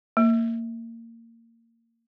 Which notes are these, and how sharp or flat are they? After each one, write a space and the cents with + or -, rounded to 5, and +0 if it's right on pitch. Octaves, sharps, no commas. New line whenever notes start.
A#3 -25